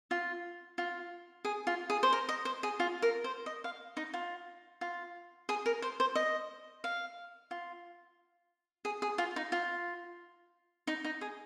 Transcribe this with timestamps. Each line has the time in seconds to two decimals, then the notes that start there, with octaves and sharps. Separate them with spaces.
0.11 F4
0.78 F4
1.45 G#4
1.67 F4
1.90 G#4
2.03 C5
2.13 A#4
2.29 D#5
2.45 C5
2.63 G#4
2.80 F4
3.02 A#4
3.24 C5
3.46 D#5
3.64 F5
3.97 D#4
4.14 F4
4.81 F4
5.49 G#4
5.66 A#4
5.82 C5
6.00 C5
6.15 D#5
6.84 F5
7.51 F4
8.85 G#4
9.02 G#4
9.18 F4
9.36 D#4
9.52 F4
10.87 D#4
11.04 D#4
11.21 G#4